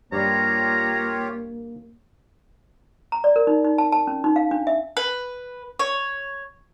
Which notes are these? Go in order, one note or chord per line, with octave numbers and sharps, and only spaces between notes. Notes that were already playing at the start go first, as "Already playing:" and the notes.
G2 G3 A#3 F4 G4 C#5 A#5
A#5
D5
A#4
D#4
D#4
A5
A5
C#4
D#4
F5
D4
E5
B4
C#5